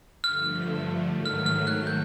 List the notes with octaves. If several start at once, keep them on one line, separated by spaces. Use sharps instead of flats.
G2 D3 F3 A3 F6
G#2 D#3 F#3 A3
F6
F6
F#6
G6